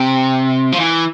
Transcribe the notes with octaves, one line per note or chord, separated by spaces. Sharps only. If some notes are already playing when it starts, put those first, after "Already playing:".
Already playing: C3
F3
E3